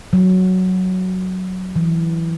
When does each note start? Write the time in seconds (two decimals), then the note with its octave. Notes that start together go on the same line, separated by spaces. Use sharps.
0.13 F#3
1.76 E3